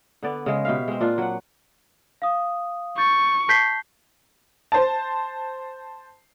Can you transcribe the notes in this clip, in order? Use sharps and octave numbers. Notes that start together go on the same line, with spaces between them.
D3 B3 D5
C#3 G#3
B2 G4 E5 F5
G#3 C4
A#2 D4 F4
F#3 F#5
F5 D#6
C#6 G6 A6
A5 G6 B6 C7
C5 A5